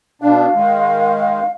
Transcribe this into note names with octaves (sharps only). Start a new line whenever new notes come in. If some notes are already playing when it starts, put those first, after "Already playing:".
B2 D4 F5
D#3 G#3